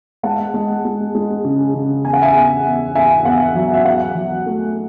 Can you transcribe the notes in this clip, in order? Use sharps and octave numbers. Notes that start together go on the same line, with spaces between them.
G#3 F#5 A5
G#3
G#3
G#3
C#3
C#3
E2 G#5
F#5
E5 G#5
E2
E2
E2 E5 G#5
E2 F#5
F#3 E5
E5
E2 F#5
F#3
A3